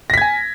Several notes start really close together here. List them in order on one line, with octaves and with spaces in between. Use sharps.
A#6 B6 G#6 G#5